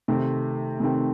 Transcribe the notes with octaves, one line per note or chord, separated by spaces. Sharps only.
C3 D#3 A3 C4
C3 D#3 A3 C4